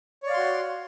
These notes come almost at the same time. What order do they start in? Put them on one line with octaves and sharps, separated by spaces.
C#5 D5 F5 C6 F#4